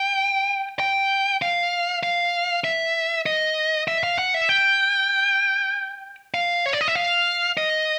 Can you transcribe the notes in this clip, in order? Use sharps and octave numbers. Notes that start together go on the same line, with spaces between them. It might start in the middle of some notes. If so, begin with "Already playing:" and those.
Already playing: G5
G5
F5
F5
E5
D#5
E5
F5
F#5
E5
G5
F5
C#5
D5
D#5
E5
F5
D#5